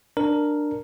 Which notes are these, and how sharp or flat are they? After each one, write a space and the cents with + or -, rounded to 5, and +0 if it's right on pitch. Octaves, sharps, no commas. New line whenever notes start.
D4 +10 A#4 +0